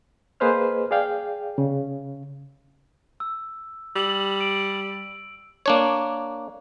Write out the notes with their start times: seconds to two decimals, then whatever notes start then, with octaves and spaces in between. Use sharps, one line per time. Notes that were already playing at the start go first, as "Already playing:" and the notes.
0.40 A#3 G#4 B4 C5 D#5 F6
0.91 G#4 D5 F5 G5
1.58 C#3
3.20 E6
3.96 G3 E6 F#7
4.41 D7
5.66 A#3 D4 C#5